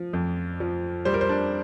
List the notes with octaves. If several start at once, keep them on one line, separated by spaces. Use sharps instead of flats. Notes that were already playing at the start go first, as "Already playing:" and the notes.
Already playing: F3
F2
F3
G3 C5
A#4
C5
D4